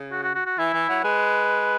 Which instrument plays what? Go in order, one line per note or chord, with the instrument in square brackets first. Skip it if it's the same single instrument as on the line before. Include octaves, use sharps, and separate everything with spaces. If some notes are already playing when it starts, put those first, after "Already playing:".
Already playing: [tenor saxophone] C#3
[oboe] F#4
F#4
F#4
F#4
[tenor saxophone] E3 [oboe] E4
[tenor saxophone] E3
F#3
[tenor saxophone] G#3 [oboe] B4